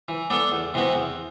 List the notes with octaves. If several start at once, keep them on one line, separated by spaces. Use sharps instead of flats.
E3
B3 D4 A4 D5
E2
C3 E3 B3 F#4
E2